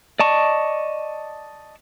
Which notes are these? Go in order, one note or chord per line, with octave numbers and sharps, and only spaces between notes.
D5 D#5 A5 C#6